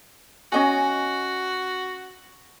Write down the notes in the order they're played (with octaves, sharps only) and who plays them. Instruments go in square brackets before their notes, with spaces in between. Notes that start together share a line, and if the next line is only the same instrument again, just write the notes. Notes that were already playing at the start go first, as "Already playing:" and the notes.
[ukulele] C#4 D#5 G#5 [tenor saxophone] F#4